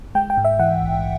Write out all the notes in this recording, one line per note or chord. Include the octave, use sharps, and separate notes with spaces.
G#3 G5
G5
G#2
E5
E3 F#5
A#1